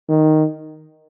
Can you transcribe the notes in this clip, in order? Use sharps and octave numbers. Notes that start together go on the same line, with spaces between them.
D#3